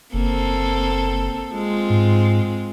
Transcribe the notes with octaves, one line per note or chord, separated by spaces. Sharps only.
F#1 A#3 C4 A4
G#3 C4 F4
G#2